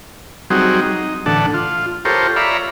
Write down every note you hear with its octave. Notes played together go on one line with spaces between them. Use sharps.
F#3 G3 C4 D#4 F#4 G#4
D#4
A2 D3 E3 D4 F#5 A5
F4
F4 G4 A4 A#4 C5 C#5
C#5 D5 E5 F5 A#5 B5